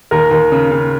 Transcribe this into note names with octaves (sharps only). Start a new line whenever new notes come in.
D#2 A#4
D#2
C#3
C#3